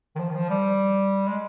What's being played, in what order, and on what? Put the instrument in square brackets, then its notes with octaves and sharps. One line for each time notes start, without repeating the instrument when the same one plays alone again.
[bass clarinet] D#3
F3
D#3
F3
G3
G#3